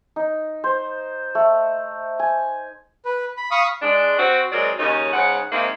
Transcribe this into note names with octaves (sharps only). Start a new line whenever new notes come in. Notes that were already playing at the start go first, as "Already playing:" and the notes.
D#4
C5
A3
G#5
B4
B5
F5 B5 C#6 D#6
G#3 D4
C4 F#4
F#3 G#3 C4 A#4 D5
D#2 C#3 C#4 D#4
G#2 C#3 F#5
G#2 D#3 A#3 C4 E5